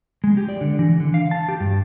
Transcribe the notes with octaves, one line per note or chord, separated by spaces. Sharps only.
G#3
G4
D5
D3
E3
D3
F5
A5
G4
G2